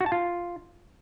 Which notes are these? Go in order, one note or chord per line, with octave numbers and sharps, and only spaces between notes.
F#4
A5
F4